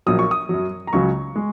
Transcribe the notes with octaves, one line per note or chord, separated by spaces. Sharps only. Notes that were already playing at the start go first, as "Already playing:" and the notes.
A#1 A#2 F#3 D#6
C#6
D#6
F#2 F#3
A#5
C#2 C#3 F#3 C#6
G#3